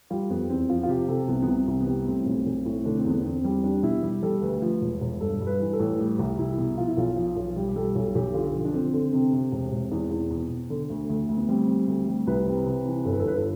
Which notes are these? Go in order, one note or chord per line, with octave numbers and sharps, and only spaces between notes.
G3 F4
F2 B3
E2 C4
F3 F4
F4
C3 G4
C3 A4
C2 B3
B3
C2
C4
C2
B3
G3
A2 C4
B1
B1
A2
D3 D4
C4
E2 B3
E2 C4
G3
G3 D4
B2 E4
G3 G4
G3 A4
D2 B4
F3
E1
E1
G2 A4
G2
B4
E3
A4
A1
A4
G3 G4
C2
C2 E4
B2
F3 F4
E4
B1 F4
F3
B1
G3 G4
G4
G3 A4
B1 A4
B1 G4
D3 F4
F3
D4
D3 C4
D3
C3 C4
C3
E1
E1
E2
E2
B2
B2
D3
D2
D2
D2
B3
G3 C4
G3
D2
G3
C2 B4
C3
C3
E3
G1 A4
B4
A4
G1 B4
A4